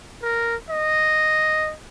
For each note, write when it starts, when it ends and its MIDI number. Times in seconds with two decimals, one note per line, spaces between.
0.23 0.56 70
0.70 1.74 75